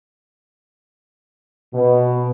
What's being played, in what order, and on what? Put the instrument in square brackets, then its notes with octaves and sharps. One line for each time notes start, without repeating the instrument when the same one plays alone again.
[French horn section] B2